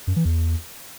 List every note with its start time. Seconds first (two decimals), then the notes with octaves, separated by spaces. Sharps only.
0.07 F#2
0.16 E3
0.25 E2